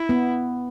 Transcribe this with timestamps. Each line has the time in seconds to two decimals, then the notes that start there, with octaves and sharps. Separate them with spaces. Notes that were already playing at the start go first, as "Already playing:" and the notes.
Already playing: E4
0.09 B3